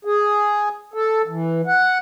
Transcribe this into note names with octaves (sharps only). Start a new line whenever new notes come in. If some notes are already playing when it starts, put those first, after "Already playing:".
G#4
A4
E3
F#5